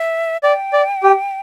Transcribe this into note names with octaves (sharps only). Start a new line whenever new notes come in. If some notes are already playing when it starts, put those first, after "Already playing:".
Already playing: E5
D5 G5
D5
G4